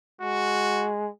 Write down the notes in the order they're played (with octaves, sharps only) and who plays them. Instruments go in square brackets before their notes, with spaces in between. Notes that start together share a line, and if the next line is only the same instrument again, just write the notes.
[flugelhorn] G#3 [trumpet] F#4